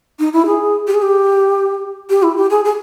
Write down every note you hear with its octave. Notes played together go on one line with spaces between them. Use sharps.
D#4
E4
G#4
G4
G#4
G4
G4
E4
G4
G#4
G#4